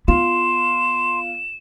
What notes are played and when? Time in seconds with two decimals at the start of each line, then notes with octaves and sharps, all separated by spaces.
0.08 B3 F4 C6 E7